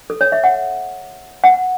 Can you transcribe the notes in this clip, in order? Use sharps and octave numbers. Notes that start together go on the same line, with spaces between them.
A4
C#5
E5
F#5
F#5